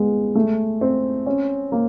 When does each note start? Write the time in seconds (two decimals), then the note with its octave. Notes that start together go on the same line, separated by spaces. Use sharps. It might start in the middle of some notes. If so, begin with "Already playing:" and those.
Already playing: G#3 B3
0.35 A3
0.81 C4
1.26 C#4
1.72 A#3